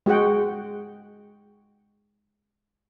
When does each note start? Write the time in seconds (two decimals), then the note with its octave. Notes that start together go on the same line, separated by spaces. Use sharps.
0.06 G#3 F#4 G#4 F#5 G5